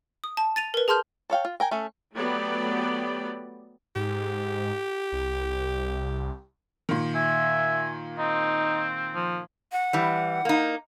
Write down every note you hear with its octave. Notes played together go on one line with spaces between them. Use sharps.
D#6
A5
A6 D#7 F7
A#4 B4
G#4 A5 C6 F6 G6
A4 C#5 F5 G5
F4
A#4 G5 G#5
A3 C#4 A4
F#3 A3 B3 G4 D5 B5
G#2 G4
C2
A#2 D#3
E5 G#5
C4 D#4
F3
F#5
E3 G3
A#3 D#4